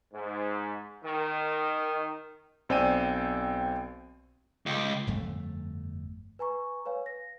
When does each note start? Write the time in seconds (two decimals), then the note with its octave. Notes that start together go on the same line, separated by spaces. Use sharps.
0.14 G#2
1.04 D#3
2.69 B1 C4 D5 G5 G#5 D#7
4.66 C#2
5.07 G1 F2 A3
6.39 B4 G#5 A#5 C#6
6.86 B4 C#5 F5 G#5
7.06 A#6